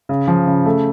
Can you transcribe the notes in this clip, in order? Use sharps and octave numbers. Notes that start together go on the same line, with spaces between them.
C#3
F3
C#3
A3